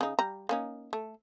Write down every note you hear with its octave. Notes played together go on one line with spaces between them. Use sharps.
C#3 D#4
G3 A#5
A#3 C#4 D#4
A3